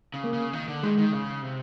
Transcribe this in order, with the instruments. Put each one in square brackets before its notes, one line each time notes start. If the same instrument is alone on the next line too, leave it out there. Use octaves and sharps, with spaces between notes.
[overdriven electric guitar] C#3
[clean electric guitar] A#3
[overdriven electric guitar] C#3
D#3
D3
[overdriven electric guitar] D#3 [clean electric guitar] G#3
[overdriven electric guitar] D#3
C#3
C3